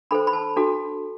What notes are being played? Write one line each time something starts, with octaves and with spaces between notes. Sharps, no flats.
D4 A4 C5 B5
B5
A5
D4 F#4 A4